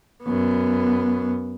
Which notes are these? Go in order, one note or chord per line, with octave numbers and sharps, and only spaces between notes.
F#2 B3